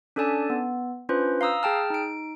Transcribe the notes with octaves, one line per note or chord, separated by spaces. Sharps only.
C#4 D4 A4 D5 G#5 A5
B3
C#4 D4 F4 B4 C5
F5 A#5 D#6 E6
G#4 G5 A5 F6
D#4 D7